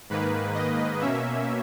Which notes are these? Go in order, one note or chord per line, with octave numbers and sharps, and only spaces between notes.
G#2 D#3 A#3 B4
D#5
B2 A#3 C#4 E5